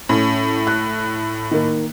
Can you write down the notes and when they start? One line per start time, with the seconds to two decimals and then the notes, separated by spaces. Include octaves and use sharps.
0.09 A2 C#4
0.67 F#6
1.51 D#3 A#3